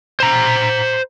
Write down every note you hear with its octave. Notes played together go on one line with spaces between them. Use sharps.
C5 A#5